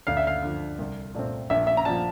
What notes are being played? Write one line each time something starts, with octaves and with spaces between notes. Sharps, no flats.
D2 F5
E5
F5
D3 F3
C2
A#2 A3 C4
A#1 E5
E5
A#5
A#2 F3 A5